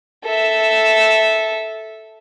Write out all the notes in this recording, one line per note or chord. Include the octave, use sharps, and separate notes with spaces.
A4 E5